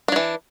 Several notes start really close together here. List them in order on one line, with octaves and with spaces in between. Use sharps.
D4 F#3 E3